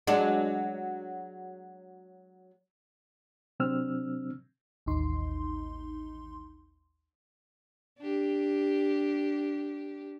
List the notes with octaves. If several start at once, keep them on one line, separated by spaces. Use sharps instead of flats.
F#3 G#3 D4
C3 F#3 C4 D4 E6 F6
A1 D#2 D#4 C6
D4 G4